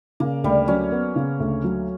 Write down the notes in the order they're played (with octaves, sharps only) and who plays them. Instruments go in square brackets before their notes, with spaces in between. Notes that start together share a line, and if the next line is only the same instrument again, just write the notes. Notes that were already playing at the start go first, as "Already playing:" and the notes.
[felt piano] C#3 [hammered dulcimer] A#3
[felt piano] D2 [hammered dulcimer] G3
[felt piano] F#3 [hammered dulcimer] C#4
[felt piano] B3
C#3
D2
F#3